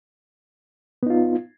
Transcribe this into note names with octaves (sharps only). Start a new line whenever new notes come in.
B3 D#4 F4